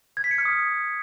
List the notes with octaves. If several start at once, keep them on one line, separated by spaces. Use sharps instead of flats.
G#6
B6
C#7
F6
D#6